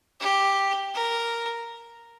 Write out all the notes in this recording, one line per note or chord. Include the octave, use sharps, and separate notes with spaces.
G4
A#4